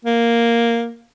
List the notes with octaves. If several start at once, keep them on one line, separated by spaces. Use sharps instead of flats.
A#3